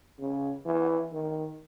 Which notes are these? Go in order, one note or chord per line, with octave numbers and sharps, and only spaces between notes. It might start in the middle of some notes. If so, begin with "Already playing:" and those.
C#3
E3
D#3